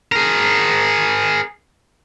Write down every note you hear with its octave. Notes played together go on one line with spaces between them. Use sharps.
G#4 A#4